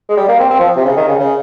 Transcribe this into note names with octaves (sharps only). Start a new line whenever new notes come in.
G#3
G3
A#3
C4
C4
F3
C3
C#3
D#3
C#3
C#3